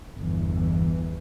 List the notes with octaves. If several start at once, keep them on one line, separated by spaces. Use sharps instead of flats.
G1 E2 E3